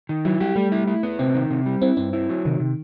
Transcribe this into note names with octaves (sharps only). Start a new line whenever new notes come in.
D#3
F#3 E4
G3 G4
G3 A3
E4
E4
B3
C3 C4
D#3
C3
G3
C4 E4
G2 C4
E4
F#3
C3 D#3
C3